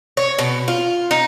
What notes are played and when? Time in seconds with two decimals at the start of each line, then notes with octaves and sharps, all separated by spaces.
0.17 C#5
0.39 B2
0.68 F4
1.11 D#4